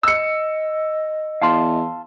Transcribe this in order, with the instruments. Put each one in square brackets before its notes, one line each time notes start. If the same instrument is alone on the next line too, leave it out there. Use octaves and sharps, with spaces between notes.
[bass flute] D#5 [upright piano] E6 C#7
[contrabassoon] E2 [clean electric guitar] F5 A5 C6